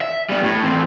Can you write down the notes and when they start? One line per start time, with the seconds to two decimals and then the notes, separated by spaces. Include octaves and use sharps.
0.01 E5
0.29 G3 B3
0.43 A2
0.63 E2 C4